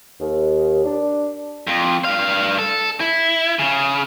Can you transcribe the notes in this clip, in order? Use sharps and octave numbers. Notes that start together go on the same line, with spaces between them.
D#2
D4
F2
G2 F5
A4
E4
C#3